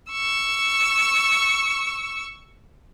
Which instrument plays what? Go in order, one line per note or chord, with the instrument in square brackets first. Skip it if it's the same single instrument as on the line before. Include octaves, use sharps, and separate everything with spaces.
[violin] C#6 E6